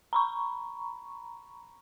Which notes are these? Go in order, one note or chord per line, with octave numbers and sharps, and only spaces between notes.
A#5 B5 C#6